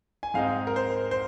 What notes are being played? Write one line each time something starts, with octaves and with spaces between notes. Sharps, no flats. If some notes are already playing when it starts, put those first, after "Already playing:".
G#5
G#2 G#3 C4 D#4 F5
A#4
C5
C5